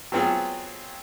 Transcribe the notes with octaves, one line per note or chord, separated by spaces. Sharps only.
F#3 B3 C4 F4 G#4